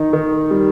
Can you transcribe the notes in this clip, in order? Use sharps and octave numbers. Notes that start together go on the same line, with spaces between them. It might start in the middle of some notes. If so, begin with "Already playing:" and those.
Already playing: D#3 D#4
D#3
G3